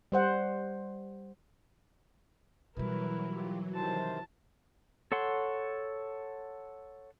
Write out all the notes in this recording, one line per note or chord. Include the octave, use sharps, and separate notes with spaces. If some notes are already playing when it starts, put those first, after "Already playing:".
G3 C5 F#5
B2 E3 F#3 G3 E4 A#4 B4
F4 G4
C3 D#3 C5 A5
A4 C#5 F#5 C6